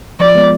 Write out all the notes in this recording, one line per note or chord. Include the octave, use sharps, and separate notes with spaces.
F3 D5
G#3 B3